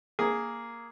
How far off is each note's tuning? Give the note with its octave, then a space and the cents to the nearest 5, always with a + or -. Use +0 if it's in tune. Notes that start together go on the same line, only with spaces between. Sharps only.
A#3 +0 G#4 +0